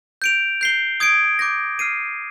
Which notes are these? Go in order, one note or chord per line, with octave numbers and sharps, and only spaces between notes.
G6 D7 F7
G6 C7 G7
D#6 G#6 D7
D6 G6 A#6
F6 C7 D#7